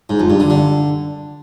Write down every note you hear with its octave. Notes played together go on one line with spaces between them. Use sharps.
G#2
F2
G2
D3
D3